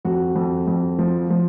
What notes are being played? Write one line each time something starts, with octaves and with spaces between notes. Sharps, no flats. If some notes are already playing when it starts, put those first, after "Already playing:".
F2 F#4
F2
F2
F3
F3